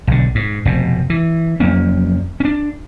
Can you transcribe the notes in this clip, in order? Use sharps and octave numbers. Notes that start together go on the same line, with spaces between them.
B1 D3
G#2
F1 B2
E3
F2 F#3 A#3 C#4
C#4 D4